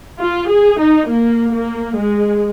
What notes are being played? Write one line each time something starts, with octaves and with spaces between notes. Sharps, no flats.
F4
G#4
D#4
A#3
A#3
G#3